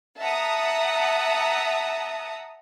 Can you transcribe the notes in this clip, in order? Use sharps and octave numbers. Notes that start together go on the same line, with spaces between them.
E5 F#5 A5 A#5 D#6